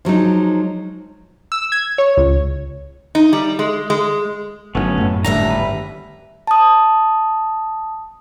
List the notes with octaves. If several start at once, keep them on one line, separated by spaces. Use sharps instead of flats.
F3 F#3 G#3 D#4
E6
G#6
C#5
C#2
D#4
G3
G#3
G#3
G1 C#3 F#3 A3 B3 C#4
F#2 A2
G1 D#2 A2 D3 G3 E5 A#5
B4
A5 D#6